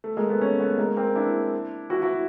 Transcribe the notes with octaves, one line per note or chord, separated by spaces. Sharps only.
A3
G#3 A#3
A3 B3
B3 C#4
A3 B3
G#3 A#3
A#3 C4
D4 E4
E4 F#4
E4 F#4